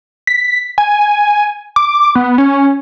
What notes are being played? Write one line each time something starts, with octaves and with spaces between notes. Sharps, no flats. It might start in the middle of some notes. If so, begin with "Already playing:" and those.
B6
G#5
D6
B3
C#4